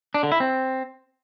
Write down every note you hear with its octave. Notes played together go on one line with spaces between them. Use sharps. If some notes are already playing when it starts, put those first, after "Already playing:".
D4
D3
E4
C4